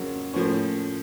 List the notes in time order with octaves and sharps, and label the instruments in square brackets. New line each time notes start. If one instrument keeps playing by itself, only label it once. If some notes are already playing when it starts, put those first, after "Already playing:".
Already playing: [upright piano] F2 C#3 F#3 A#3
A2 F3 A#3 C#4